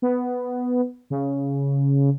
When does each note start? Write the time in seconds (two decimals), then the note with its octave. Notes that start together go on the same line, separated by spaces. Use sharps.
0.02 B3
1.10 C#3